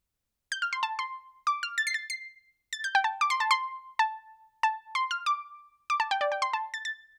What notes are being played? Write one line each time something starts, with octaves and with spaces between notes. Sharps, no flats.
G6
F6
C6
A5
C6
D6
F6
A6
C7
A6
C7
A6
G6
G5
A5
D6
C6
A5
C6
A5
A5
C6
F6
D6
D6
A5
G5
D5
G5
C6
A5
A6
A6